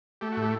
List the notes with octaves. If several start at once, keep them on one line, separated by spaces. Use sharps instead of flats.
A3 G4
F#4
A2
G4